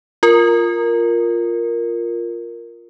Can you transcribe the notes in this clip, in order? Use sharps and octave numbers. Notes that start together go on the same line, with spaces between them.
F4 A#4